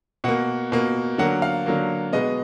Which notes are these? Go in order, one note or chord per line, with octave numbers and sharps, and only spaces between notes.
B2 A#3 F#5
B2 A#3
D3 F#3 A#3 F#5
F5
D3 F#3 A#3
B2 G#3 B3 D#5